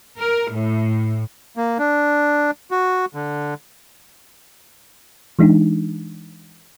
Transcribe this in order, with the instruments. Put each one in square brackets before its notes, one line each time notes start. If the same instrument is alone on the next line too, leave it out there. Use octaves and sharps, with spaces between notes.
[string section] A#4
A2
[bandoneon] A#3
D4
F#4
D3
[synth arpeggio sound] E3 G#3 D4 D#4